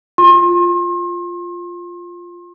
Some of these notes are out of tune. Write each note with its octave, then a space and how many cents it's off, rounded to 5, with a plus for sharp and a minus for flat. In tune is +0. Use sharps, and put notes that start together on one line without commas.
F4 +0 C6 +35